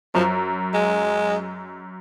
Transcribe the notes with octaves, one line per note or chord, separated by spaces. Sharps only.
F#2 F3
G#3